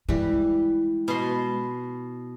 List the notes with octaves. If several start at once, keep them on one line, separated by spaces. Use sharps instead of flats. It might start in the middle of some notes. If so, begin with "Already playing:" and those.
E3 G3 G#3
B2 C6